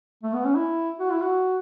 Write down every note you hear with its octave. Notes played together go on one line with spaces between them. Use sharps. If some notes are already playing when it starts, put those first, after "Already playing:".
A3
B3
C#4
E4
F#4
E4
F#4